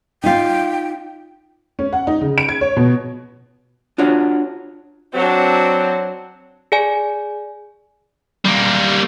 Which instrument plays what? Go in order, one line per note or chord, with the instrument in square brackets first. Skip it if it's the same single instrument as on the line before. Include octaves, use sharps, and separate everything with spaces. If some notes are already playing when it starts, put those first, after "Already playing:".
[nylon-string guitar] D#4 F4 [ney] G5
[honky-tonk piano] C#4
F#5
D#4
C#3
D7
G#6
C#5
B2
[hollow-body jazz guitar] D4 F4 F#4 C#5
[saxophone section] F#3 C4 [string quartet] D4 F#4
[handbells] G#4 D5 G#5
[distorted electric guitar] G3 A#3